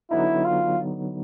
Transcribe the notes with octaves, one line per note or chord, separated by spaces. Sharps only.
D3 F#3 B3 D#4 E4
F4